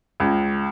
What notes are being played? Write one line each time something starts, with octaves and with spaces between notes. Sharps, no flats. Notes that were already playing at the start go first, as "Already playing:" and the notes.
C#2